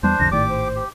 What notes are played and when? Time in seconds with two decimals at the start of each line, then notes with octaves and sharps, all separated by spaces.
0.03 E2 G3 B3 D4 C5
0.19 B1 F2 D3 A#6
0.31 G#1 A2 D#3 G4 D5 D6
0.48 C5
0.76 G4